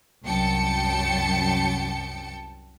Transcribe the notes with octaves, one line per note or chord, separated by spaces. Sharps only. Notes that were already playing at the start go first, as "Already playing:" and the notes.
C2 F#2 G5 A5 C#7